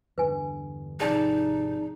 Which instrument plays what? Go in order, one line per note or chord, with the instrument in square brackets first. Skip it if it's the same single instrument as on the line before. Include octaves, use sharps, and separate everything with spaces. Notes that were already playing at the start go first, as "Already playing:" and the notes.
[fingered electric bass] E2 G2 D3 [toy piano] B4 G#5
[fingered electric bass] G#1 C3 F3 [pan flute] D#4 [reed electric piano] G#4 D5 A5